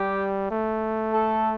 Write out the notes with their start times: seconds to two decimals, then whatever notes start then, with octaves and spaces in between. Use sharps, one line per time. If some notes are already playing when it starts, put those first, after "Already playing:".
Already playing: G3 G4
0.51 A3
1.13 A4